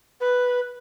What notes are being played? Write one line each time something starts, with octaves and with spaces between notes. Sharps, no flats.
B4